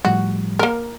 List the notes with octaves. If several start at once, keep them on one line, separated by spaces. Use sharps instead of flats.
A2 F3 G3 F#4
A#3 A#4